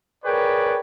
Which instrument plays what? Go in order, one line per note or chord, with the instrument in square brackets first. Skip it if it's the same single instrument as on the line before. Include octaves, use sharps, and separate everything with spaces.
[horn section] G#4 A#4 B4 C#5 D5 G5